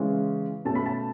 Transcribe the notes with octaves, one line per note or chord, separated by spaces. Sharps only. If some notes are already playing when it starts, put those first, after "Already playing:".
Already playing: C#3 E3 G#3 C#4
B2 A3 C#4 A5
B5
A5